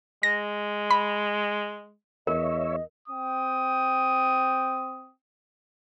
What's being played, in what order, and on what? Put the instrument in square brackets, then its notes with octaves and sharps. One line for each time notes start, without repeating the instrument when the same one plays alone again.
[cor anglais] G#3 [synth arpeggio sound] A#6
[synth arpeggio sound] B5
[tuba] E2 [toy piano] A#4 [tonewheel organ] C#5 E5 [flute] D#5
[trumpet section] C4 G5 D#6